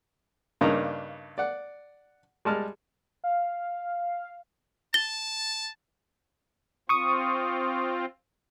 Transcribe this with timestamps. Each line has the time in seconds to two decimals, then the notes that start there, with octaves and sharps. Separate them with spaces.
0.61 G2 C#3 A#3 D4 D#4 A#5
1.38 D5 F#5
2.45 G3 G#3 A5 F6
3.24 F5
4.94 A5 A6 G7
6.89 C4 F4 C#6 D#6